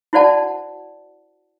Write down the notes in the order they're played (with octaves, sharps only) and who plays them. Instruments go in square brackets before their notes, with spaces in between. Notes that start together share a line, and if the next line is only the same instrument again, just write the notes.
[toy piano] E4 F#4 C5 D5 F#5 A5